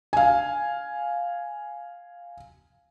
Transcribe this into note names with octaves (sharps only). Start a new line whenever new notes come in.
F5 G#5